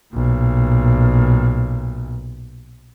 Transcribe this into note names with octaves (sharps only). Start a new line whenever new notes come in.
B1 A#2